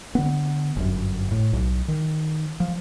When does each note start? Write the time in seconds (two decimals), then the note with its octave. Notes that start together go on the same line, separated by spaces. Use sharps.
0.15 D3 B3
0.76 G1 F#2
1.31 A2
1.53 B1
1.88 D#3
2.60 F3